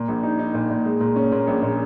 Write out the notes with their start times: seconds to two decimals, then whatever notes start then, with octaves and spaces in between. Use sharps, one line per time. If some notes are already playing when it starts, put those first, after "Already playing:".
Already playing: A#2
0.08 A#1
0.23 D#4
0.39 D#4
0.54 A#2
0.70 A#2
0.85 G#3
1.00 A#2
1.16 C#4
1.32 A#2
1.47 A#1
1.62 A#2